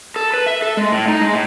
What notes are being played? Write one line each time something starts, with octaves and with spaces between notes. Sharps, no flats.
A4
B4
E5
A4
G#3
A2
D#4
G#3
A2